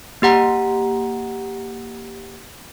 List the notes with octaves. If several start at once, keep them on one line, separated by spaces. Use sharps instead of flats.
A#3 G4 F#5 A#5